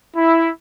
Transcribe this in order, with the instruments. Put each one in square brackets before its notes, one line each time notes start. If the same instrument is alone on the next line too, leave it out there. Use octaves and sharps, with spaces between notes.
[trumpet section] E4